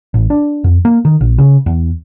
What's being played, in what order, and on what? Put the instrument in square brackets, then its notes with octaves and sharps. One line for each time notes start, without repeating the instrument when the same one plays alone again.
[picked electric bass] A1
D4
F2
A#3
D#3
A#1
C#3
E2